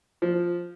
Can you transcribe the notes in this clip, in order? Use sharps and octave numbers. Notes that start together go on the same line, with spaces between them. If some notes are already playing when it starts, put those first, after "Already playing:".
F3